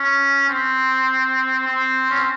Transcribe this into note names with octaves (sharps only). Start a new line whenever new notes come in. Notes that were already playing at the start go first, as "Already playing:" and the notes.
Already playing: C#4
C4
C4
C#4
C4